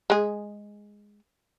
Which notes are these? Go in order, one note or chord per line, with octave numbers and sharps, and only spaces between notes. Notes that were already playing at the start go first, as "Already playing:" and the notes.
G#3 G#4